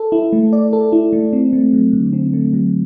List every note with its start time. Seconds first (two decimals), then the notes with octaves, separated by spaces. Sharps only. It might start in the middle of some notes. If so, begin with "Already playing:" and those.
Already playing: A4
0.12 E4
0.33 A3
0.53 D5
0.73 A4
0.92 E4
1.13 A3
1.33 C4
1.53 A3
1.73 F#3
1.93 D3
2.13 C4
2.33 A3
2.53 F#3